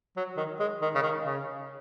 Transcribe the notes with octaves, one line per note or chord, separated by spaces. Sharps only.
F#3
D#3
G#3
D#3
C#3
D#3
C#3